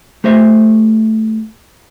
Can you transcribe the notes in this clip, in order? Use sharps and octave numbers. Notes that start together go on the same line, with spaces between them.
A3 G4 C5 D#5 E5